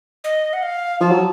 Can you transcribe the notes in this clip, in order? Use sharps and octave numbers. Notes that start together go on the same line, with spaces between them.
D#5
F#5
F5
F3 A5
F#3